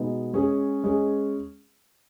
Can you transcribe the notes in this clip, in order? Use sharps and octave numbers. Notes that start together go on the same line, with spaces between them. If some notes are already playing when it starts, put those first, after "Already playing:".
Already playing: B2 G#3 B3 D#4
G#3 C#4 G#4
G#3 C#4 G#4